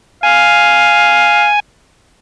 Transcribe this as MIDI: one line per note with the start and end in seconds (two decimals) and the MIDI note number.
0.23 1.49 77
0.23 1.60 80